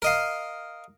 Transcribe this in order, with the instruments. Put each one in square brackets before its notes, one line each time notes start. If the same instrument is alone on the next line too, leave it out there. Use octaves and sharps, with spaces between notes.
[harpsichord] A#4 D#5 F5